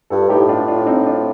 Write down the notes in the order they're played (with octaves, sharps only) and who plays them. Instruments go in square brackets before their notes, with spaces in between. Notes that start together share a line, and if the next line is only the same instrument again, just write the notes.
[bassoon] G2 [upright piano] F4 A4
[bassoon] A2 [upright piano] D#4 G4
[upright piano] D4 F4
D4 F4
C4 D#4
D4 F4